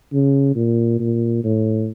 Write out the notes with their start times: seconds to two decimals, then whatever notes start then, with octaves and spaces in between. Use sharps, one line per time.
0.13 C#3
0.55 A#2
0.99 A#2
1.44 A2